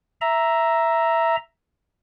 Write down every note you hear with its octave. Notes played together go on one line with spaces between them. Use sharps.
E5 A#5